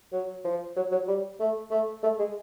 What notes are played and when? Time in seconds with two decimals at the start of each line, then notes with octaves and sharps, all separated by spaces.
0.12 F#3
0.45 F3
0.76 F#3
0.92 F#3
1.08 G3
1.40 A3
1.71 A3
2.03 A3
2.18 G#3